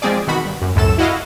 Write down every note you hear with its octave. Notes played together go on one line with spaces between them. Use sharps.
F3 G#3 C4 G#4 D5
B2 D#3 F#4 B5
G2
F#2
C#2 F#2 A2 A4 E7
E4 F#4 D#5 F5